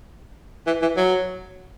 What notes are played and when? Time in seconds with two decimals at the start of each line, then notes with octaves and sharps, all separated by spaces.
0.67 E3
0.82 E3
0.96 F#3